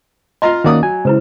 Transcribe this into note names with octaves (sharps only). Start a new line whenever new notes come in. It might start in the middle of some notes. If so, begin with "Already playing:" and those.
F4 D#5 F5 A#5 C6
D#3 A#3 C#4 F#4 D5 D#6
F#3 G#5
C#3 G#3 E4 B4 C5